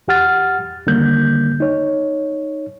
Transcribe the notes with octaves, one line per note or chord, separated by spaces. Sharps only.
E2 G4 F#5 F6 A6
E2 D3 D#3 G3 A#3 G6
D#4 C#5